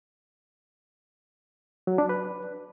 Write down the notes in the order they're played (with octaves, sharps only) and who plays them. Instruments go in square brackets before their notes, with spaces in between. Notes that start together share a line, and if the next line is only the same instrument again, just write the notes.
[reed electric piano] F#3
D4
B4